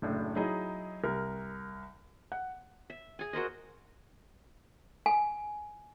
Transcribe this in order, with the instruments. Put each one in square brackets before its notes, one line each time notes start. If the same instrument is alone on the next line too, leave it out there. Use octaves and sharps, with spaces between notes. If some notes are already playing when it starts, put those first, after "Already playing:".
[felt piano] F#1 A2 D4
F#3 D#4 E4 G#4 D#5
C2 A#4
F#5
[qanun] E5
G#4 G#5
F#4 A#4 C5 D#5
[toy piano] G#5